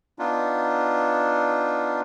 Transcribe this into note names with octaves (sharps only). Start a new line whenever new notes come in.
B3 D4 D#4 F4